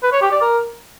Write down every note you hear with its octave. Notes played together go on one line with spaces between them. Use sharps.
B4
C#5
G4
D5
A#4